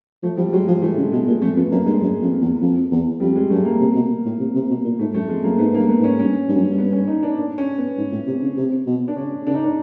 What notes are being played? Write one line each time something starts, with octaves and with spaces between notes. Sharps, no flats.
F3 A3
F3 G3
F#3 G#3
F3 G#3
E3 A3
C#3 G#3
B2 G#3
A#2 G#3
F2 A3
F2 B3
F#2 A#3
G2 G#3
F#2
F2
E2
F2
E2
F2 G3
G#3
F#2 A3
A#3
C3
B2
A2
C3
C3
B2
A#2
G#2 A3
F#2 A3
F2 G#3
F#2 A#3
G#2 B3
G#2
A#3
G2
B3
G#2
C#4
G2 C#4
G2
F#2
G2
B3
C#4
D#4
D4
D4
C#4
B3
G#2
A2
C3
C#3
C3
B2
D4
C#3 C#4
C#3 D4
D#4
D4